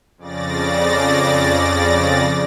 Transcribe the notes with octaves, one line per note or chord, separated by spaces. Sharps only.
F2 C#3 D5 A6 A#6